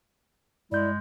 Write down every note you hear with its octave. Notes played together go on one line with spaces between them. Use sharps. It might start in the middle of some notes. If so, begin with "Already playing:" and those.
G2 G#3 E4 D5 G6